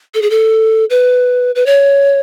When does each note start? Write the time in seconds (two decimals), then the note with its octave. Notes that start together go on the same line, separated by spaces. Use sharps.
0.14 A4
0.22 G#4
0.30 A4
0.90 B4
1.55 B4
1.66 C#5